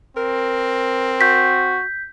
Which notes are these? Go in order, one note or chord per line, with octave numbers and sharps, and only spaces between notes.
C4 A#4
F#4 G6 B6